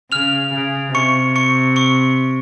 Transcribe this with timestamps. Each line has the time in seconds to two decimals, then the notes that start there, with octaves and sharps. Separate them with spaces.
0.12 C#3 F6 F7
0.53 C#3
0.94 C3 C#6 C#7
1.36 C#6 C#7
1.76 C#6 C#7